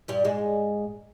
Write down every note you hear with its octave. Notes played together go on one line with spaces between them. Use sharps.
G2 G3
G#2 G#3